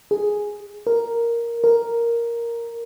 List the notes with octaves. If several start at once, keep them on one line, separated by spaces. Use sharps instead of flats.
G#4
A#4
A#4